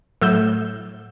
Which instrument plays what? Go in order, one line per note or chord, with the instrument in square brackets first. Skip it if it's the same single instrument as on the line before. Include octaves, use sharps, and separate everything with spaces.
[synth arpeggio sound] A2 F#3 E6 G6